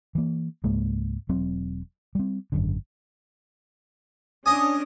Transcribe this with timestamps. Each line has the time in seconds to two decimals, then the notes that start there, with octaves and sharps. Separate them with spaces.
0.15 E3 A#3
0.64 C#2 G#2 G#3 A#3
1.29 E1 F#3 C4
2.15 G3 C4
2.52 G#1 F#2 D3
4.46 C#4 D4 D#5 G#5 D#6